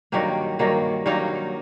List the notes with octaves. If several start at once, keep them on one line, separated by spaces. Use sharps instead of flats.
G2 D#3 F#3 A#3 G4
G2 D#3 F#3 A#3
G2 D#3 F#3 A#3 D#4